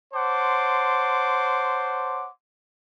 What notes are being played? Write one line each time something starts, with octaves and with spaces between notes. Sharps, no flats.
C5 C#5 F#5 A5 C6 D6